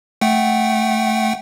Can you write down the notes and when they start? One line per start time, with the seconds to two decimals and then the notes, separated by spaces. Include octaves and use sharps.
0.21 A3 F#5 G5